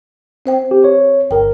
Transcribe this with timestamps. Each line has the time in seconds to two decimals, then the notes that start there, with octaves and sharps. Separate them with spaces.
0.46 C4 C5 G5
0.71 G4
0.84 C#5
1.31 G1 A#4 G5